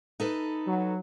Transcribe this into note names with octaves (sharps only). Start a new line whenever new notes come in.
D#4 A4 B4
F#3